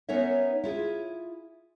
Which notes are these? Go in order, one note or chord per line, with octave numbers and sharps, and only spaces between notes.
B3 C#4 D#4 A#4 C#5 E5
E4 F4 G#4